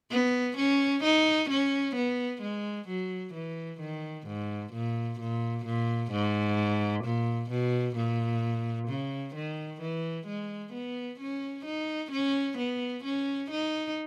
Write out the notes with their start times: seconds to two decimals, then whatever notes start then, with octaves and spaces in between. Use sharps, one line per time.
0.11 B3
0.57 C#4
1.03 D#4
1.49 C#4
1.95 B3
2.42 G#3
2.88 F#3
3.34 E3
3.80 D#3
4.27 G#2
4.73 A#2
5.19 A#2
5.65 A#2
6.12 G#2
7.04 A#2
7.50 B2
7.96 A#2
8.88 C#3
9.35 D#3
9.81 E3
10.27 G#3
10.73 B3
11.19 C#4
11.65 D#4
12.11 C#4
12.58 B3
13.04 C#4
13.51 D#4